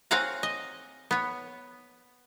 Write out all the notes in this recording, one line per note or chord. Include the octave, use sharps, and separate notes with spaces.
C4 C#5 F5 F#5 G#5 A#5
D#5
B3 C#5